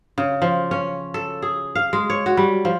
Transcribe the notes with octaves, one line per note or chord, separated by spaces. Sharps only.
C#3
F3
C#4
A4
G#4
F5
G#3
C#5
F#4
G3
F3